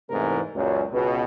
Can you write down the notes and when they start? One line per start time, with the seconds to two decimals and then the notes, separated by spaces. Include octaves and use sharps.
0.10 E2 G#2 C3 E3 A3 A#4
0.55 C#2 F#2 A#2
0.93 C#2 B2 B4